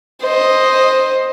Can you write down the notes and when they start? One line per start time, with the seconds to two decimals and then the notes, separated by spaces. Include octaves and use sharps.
0.22 C5 D#5